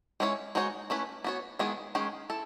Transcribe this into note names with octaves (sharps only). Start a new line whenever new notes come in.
G#3 C#4 E4 A4 C#5
G#3 D#4 F#4 C#5
A3 C#4 E4 B4
B3 F#4 C#5
D#3 G#3 B3 E4 G#4
D#3 G#3 C#4 G#4
E4 A4